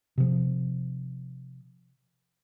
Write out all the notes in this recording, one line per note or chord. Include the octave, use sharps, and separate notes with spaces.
C3 F3